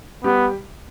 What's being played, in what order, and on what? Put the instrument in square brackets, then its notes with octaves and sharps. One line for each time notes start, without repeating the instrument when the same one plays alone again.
[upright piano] G3 G4 [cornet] B3